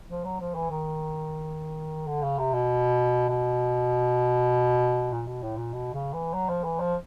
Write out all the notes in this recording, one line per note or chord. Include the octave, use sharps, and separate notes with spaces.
F3
F#3
F3
E3
D#3
D3
C#3
C3
B2
B2
A#2
B2
A2
A#2
B2
C#3
E3
F#3
F3
E3
F3